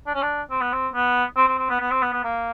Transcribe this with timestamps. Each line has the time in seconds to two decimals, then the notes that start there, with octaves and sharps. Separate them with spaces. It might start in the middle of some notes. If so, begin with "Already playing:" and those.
0.06 D4
0.15 C#4
0.22 D4
0.50 C4
0.61 B3
0.72 C4
0.94 B3
1.37 C4
1.48 C4
1.58 C4
1.69 B3
1.80 B3
1.91 C4
2.02 B3
2.13 B3
2.24 A#3